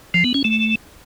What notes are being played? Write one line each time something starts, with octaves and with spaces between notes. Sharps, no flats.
F3
B3
C#4
A3